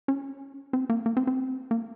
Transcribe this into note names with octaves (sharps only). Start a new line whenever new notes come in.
C#4
C4
A#3
A#3
C4
C4
A#3